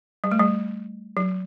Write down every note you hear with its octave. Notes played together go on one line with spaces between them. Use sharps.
G3
A3
G3
F#3